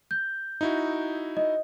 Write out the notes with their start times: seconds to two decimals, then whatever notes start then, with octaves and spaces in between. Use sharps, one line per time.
0.11 G6
0.61 D#4 E4 F#4
1.37 D#5